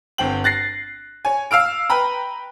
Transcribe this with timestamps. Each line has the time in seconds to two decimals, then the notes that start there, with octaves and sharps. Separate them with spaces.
0.18 G1 C4 G5 F#7
0.44 F#6 A6 A#6 C7
1.25 C#5 G#5
1.51 F5 E6 F6 D7
1.90 B4 G5 A#5 B5